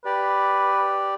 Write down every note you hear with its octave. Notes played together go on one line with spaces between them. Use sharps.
G4 B4 D5